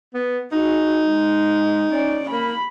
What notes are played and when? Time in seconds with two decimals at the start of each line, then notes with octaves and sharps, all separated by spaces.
0.14 B3
0.52 D#4 F#4 G#4
1.04 G#3
1.92 C#4 D5
2.30 A#3 B5